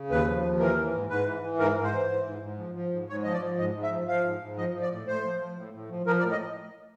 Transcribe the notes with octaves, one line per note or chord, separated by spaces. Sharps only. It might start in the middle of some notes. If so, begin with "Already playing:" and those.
Already playing: C#3
D#2 B4
F3
D#2
E3 A#4
E3
G#2
G#2 B4
E3
E3
G#2 A#4
G#2
C5
E3
E3
G#2
G#2
F3
F3
G#2
G#2 C#5
F3 D#5
D5
F3
G#2 D#5
G#2
E5
F3
F3 F5
G#2
G#2
F3 D#5
F3
D5
A2
A2 C5
F3
F3
A2
A2
F3
F3 A#4
D5
A2
D#5